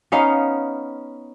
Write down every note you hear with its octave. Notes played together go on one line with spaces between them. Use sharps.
B3 C#4 D#4 F5